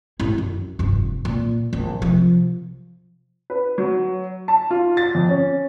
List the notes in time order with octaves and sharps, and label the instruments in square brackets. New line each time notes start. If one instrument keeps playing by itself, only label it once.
[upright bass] A1 E4
F#2
F1 G2
A#2
A#1
C3 F3
[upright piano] B4
F#3
A5
F4
A6
F2
C#4